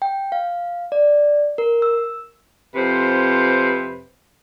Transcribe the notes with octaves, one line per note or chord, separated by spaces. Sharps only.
G5
F5
D5
A#4
E6
F2 C3 B4 C5